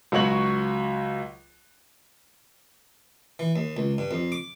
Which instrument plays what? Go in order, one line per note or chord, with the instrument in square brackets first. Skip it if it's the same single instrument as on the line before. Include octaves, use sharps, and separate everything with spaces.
[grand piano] C#2 F#3 F#4 C#5 F#7
[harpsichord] E3
D#2
C#2
G2
F2
D6